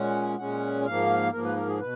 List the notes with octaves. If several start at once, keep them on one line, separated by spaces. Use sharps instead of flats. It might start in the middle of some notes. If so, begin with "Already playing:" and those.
Already playing: A#2 G#3 C#4 F#5
A#2 G#3 C#4 F#5
G#2 F3 A#3 F5
G#2 F3 A#3 A#4
B4
A#4
G#4
B2 B4